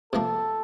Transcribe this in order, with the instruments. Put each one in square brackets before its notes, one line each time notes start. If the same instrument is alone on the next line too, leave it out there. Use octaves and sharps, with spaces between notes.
[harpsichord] C3 F3 A#3 [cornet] A4